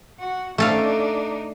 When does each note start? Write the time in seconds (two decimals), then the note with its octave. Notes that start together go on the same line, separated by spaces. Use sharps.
0.19 F#4 F#5
0.58 A3 D4 D#4 A4 F5